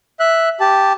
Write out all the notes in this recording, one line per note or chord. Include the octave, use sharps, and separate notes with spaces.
E5 F#6
G4 A5